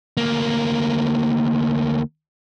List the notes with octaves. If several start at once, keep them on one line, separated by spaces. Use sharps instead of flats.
D2 A#3